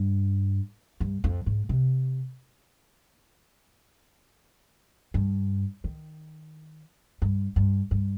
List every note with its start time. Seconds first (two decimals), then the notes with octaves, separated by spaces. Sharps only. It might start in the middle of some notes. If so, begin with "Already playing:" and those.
Already playing: G2
1.00 G2
1.24 F2
1.46 G#2
1.69 C3
5.14 G2
5.84 D#3
7.22 G2
7.56 G2
7.91 G2